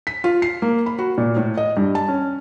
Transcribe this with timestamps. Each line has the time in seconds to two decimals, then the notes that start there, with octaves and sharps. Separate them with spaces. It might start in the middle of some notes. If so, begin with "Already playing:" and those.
0.07 B6
0.24 F4
0.42 C7
0.62 A#3
0.86 B5
0.99 F#4
1.18 A#2
1.37 A2
1.57 D#5
1.77 G2
1.95 A5
2.08 C#4